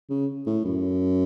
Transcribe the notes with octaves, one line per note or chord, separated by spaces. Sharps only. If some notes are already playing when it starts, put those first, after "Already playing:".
C#3
A2
F#2